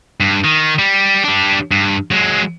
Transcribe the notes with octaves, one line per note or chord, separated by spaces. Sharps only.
G2
D#3
G3
G3 D4
G2
F#3 G#3